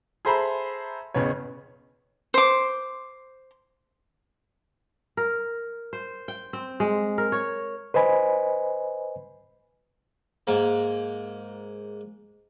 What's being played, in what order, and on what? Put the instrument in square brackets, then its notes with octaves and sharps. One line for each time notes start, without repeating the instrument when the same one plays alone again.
[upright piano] G#4 A4 C5 E5 A#5 B5
A1 E2 C#3 B3 C#5
[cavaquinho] C5 D6
[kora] A#4
C5
G5
C4
G#3
A#4
C#5
[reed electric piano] B4 C5 D#5 G#5 B5
[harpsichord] G#2 A#3